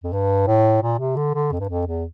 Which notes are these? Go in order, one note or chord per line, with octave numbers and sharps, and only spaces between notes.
F2
G2
A2
A#2
C3
D3
D3
F2
G2
F2
E2